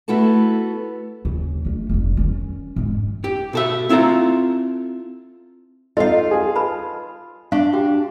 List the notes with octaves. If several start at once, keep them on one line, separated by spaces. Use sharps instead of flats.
A3 B3 E4 F#4 A4 A5
D#2 C#3
A3 D4
F1 G2
D#3 C#4
F2 G#2
G4
B2 A4 E5
C4 E4 F4 A4 A#5
D#4 F4 A4 D#5 F5
G#4
B4 A5 B5
D4 F5 C#6
F#4 G4 G5